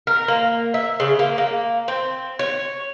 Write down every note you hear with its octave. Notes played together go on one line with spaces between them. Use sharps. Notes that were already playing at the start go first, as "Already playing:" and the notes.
A#4
A#3
E5
C#3
A#3
A#3
C4
C#5